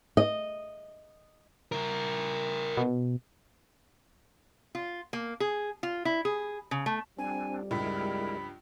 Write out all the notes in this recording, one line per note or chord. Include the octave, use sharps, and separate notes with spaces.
D#5
E4 A#4
B2
F4
A#3
G#4
F4
E4
G#4
C#3
A3
F2 G3 C4 D4 G#5
C#2 G2 G#3 E4 A#4 B5